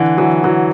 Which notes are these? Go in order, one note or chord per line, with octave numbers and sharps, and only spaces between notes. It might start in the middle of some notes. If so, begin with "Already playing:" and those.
Already playing: D3 E3
E3 F#3
E3 F#3